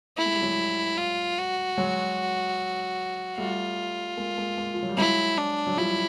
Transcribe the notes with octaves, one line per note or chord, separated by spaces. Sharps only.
A3 E4
G#3
G3
F#3 G#3
F4
F#4
F#3 G#3
G3 A3 F4
G#3 A#3
G#3 A#3
G#3 A#3
F3
F#3
G3
F#3 G#3 E4
D4
F#3
F3 G3 E4